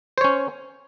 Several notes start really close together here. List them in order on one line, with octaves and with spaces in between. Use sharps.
C5 C#5 C#4